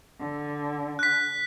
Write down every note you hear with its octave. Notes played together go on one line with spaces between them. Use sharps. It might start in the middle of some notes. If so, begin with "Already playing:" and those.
D3
F#6 B6